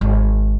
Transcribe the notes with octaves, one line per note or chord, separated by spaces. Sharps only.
G#1